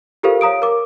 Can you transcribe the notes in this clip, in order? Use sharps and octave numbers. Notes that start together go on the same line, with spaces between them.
F4 G4 A4 A#4 C5 F5
C#5 F5 A#5 D#6 D7
A#4 D6